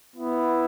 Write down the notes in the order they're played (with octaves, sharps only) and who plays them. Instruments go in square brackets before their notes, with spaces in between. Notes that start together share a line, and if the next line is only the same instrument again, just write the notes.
[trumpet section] B3 E4